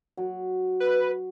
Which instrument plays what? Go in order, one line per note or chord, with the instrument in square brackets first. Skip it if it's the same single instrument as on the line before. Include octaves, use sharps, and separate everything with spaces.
[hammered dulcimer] F#3
[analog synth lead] B4